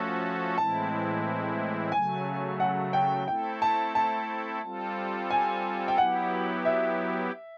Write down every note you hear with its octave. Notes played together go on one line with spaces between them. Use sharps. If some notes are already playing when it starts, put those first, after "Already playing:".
Already playing: F3 A3 C#4 F#4 A4
A2 E3 G#3 C4 E4 A5
C#3 F#3 A3 G#5
F#5
G5
A3 C4 E4 A4 G5
A5
A5
G3 C4 F4 A4
G#5
G5
F#3 B3 E4 G4 F#5
E5